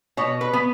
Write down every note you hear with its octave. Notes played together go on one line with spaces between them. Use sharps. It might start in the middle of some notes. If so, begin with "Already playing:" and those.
B2 C#5
B4
B3